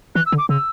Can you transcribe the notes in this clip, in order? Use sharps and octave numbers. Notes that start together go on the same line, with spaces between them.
E3 F#6
E6
D3
D6
C#3 E6